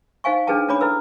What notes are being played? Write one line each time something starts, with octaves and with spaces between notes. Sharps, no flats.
D#4 C5 F5 G#5 C#6
D4 D#4 G#4 B4 G5 A5
C#4 D4 C#5 B5 D6
E4 A4 B4 E6